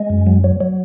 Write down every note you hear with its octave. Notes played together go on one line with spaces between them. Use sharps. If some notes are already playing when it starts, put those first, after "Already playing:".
Already playing: G#3
F#2
F#3
F#3
F#3